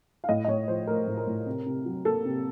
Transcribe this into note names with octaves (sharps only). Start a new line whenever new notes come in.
F5
A2 D#5
D#5
A2 C#5
F3 C5
A3 A#4
A2
A#4
A2
C3
C3
F#3
A#3 A4
C3